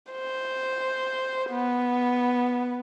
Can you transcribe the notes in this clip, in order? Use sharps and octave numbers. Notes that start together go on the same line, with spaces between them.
C5
B3